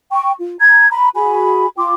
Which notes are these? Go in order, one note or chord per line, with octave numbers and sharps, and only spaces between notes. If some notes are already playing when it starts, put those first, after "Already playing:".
G5 C#6
F4
A#5 G#6
A#5 B5
F#4 G#4 G#5 B5
F4 G5 C6 D6